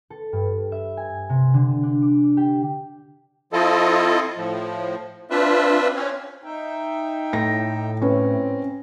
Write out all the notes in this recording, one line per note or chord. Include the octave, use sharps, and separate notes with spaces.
A4
G2
E5
G#5
C3
D3
D4
D6
G4
F3 C4 E4 F4 A4 D#5
A2 F3
C4 D4 F4 B4 E5
C4 C#4
D#4 E5 G5
A2 A#6
C4 C#4 B4